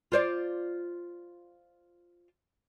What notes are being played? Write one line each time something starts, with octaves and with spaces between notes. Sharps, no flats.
F4 C5 D5